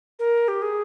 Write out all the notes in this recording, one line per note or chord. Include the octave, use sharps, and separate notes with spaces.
A#4
G4
G#4